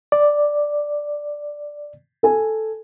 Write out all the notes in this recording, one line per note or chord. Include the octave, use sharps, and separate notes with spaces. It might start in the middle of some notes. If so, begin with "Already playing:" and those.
D5
A4 G#5